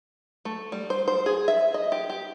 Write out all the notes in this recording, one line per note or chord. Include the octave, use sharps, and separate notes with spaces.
A3
G3
C5
C5
G#4
E5
D#5
G4
G4